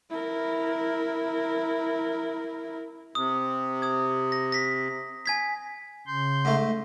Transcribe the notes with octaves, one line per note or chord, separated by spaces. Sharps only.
E4 A#4
C3 D#6
D#6 G#6
A#6
A#6 B6
G#5 G#6 B6
C#3 C6 G6
G#2 A3